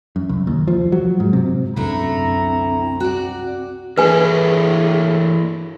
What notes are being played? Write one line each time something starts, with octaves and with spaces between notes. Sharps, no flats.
F#2
C2
D#2
F3
F#3
G#2
C3
C2 F#2 D3 A3 C4 E4 A#5
F#4 D5
A2 E3 A#3 G#4 B4 G#5